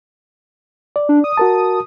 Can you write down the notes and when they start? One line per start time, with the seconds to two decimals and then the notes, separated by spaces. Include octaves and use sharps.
0.96 D5
1.09 D4
1.24 D#6
1.37 F#4 A#4 A5